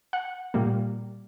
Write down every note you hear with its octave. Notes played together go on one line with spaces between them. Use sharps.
F#5
A#2 G3 A#3